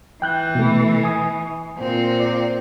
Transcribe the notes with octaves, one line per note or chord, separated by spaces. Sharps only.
E3 G5 F#6 G6
B2 A3
G#5 D#6
A#2 C4
D5